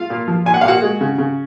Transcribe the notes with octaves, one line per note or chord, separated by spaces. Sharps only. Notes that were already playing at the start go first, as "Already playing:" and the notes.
Already playing: F4 F5
A#2
F3
A#2 G#5
F#5
F5
A#2 F#4 F#5
G#3
C#3
C#3